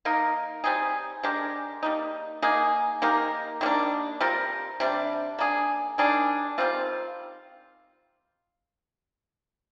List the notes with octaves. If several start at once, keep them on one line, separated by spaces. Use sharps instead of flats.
A#3 D#4 A#4
G3 C4 D#4 G#4
G#3 D4 G4 A#4
G3 A#3 D#4
A#3 D#4 G#4
A#3 D#4 G4 A#4
D#3 G3 A#3 D4
G3 C4 F4 A#4
C3 G3 D4
A#3 D4 G#4
D#3 G3 D4 G#4
D#3 G3 C4 F4